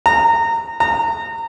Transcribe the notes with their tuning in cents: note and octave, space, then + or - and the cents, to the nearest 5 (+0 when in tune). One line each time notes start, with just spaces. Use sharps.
A#5 -20
A#5 -25